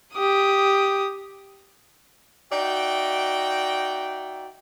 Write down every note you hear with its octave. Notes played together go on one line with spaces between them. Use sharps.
G4 D#6
D#4 F#4 D5 E5 G5